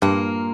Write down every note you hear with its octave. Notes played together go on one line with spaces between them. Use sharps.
G2 A#2 A#3